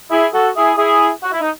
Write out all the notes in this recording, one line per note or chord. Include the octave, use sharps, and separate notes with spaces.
E4 G#4
F#4 A4
E4 G#4
E4 G#4
F#4
E4
D#4